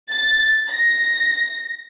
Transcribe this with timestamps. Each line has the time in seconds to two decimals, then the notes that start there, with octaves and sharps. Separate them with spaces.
0.10 A6
0.70 A#6